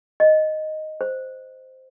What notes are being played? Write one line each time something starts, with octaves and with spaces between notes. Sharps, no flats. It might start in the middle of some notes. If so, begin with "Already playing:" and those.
D#5
C5